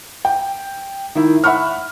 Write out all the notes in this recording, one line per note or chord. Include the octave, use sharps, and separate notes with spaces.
G5
D#3 E4
E5 F#5 B5 C#6 F6